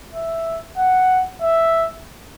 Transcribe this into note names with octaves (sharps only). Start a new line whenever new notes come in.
E5
F#5
E5